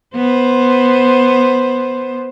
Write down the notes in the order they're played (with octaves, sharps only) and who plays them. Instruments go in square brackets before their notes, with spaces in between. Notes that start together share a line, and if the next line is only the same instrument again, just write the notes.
[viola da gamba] B3 C5